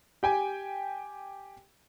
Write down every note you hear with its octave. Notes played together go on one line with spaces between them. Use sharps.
G4 G5 G#5